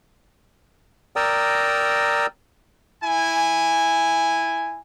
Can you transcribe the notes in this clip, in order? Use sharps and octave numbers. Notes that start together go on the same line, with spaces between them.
A#4 D5 G5 A#5 D#6 E6
E4 G#5